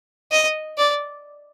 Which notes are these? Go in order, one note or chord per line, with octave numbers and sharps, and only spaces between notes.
D#5
D5